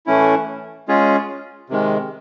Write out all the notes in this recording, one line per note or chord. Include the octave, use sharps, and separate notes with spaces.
A2 E3 A3 C#4 E4
G#3 C#4 F4 G#4
C3 D#3 G#3